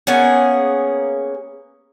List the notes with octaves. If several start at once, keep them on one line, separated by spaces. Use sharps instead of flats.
A#3 B3 C#4 G#4